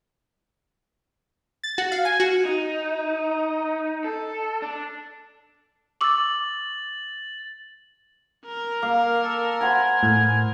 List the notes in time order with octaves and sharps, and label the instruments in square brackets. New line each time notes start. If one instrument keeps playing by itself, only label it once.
[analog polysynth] A6
F#4
F5
G#5
F#4
[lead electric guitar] D#4
A4
D4
[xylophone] C#6 D6 E6 [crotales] A6 F#7
[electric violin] A#4
[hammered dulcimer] A#3 [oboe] F5
[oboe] A4
[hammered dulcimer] C5 F#5 B5 [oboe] G#5
[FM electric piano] A2